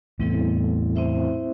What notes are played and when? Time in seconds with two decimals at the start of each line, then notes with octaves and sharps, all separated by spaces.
0.19 E2 A2 G3 C4 E4 A4
0.96 C4 E4 C5 E5